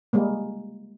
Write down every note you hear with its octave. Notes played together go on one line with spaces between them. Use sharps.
G3 G#3 A#3